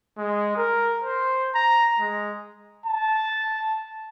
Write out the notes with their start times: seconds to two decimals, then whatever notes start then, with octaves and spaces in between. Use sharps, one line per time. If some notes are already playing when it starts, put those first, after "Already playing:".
0.18 G#3
0.57 A#4
1.03 C5
1.55 A#5
2.00 G#3
2.86 A5